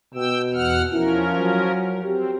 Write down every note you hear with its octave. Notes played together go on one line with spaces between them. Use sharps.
B2 G5 E6
E2 F#5 F6
F3 C#4 E4 A#4
F#3
C4 G4